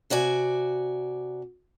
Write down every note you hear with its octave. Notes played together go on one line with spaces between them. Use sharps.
C3 F#4 D5 G#5